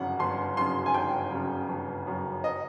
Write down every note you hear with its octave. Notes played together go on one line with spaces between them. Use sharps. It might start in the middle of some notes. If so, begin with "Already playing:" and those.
Already playing: G1 F#2 C#3 F#5
G1 C6
F#2 C#3 C6
G#5
G1 G5
F#2 C#3
G1
F#2 C#3
D#5